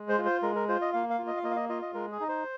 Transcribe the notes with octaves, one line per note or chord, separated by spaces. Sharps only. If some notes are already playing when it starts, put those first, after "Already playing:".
Already playing: G#3
C5
F4
C5
G#3 A#4
A#4
F4 C5
D#5
A#3 F5
F5
F4
D#5
F5
A#3 D#5
F5
D#5
F4 D#5
D#5
G#3 A#4
G#4
D#4 D#5
C5